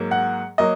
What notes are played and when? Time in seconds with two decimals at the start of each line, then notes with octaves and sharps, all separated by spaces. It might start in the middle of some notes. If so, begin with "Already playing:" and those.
Already playing: G#2 F#3 A#3
0.11 F#5
0.58 F#3 A#3 D#5